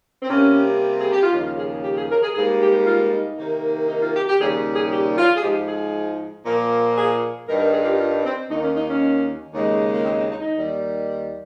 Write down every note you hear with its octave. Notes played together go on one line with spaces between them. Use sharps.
C4
C3 G3 A#3 C#4
G#4
G4
F4
D#2 C#3 F3 D#4
F4
G#4
G#4
G4
G#4
A#4
G#4
G#2 G3 A#3 G#4
G4
F4
D#4
C3 D#3 A#3
D#4
F4
G4
G4
D#2 C#3 G3 G#4
G#4
G4
F4
G#4
G#2 F3 G#3 G4
G#4
A#2 F3 A#3
G#4
G2 D#3 G3 A#4
A#4
G#4
F4
G4
F4
C4
D#2 D#3 A#3 D#4
C#4
D#4
C#4
D#2 C#3 G#3
A#3
C4
C4
D#4
D#4
D#2 D#3 G3